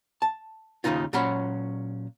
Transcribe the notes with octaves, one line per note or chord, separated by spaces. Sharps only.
A5
D#2 A#2 C#3 D#4 F4
A#2 F#3 C#4 F#5 B5